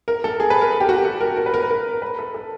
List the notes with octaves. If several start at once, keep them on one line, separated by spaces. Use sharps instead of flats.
A#4
A4
G#4
B4
A#4
A4
G4
F#4
G4
A4
A#4
A#4
B4
A#4
B4
A#4
B4
A4
A4